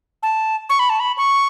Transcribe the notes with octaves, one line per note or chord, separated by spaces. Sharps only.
A5
C#6
B5
A5
B5
C#6